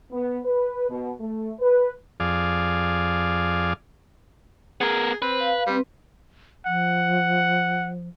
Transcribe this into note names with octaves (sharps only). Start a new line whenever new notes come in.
B3
B4
B2
A3
B4
F2 G#4 D5 F5
B3 G#4 A#4
C4 B4 C5
F5
G3 C4 B4
F3 F#5